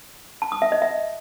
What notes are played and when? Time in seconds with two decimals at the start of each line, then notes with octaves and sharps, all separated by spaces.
0.42 A5
0.52 D#6
0.62 E5
0.72 D#5
0.82 E5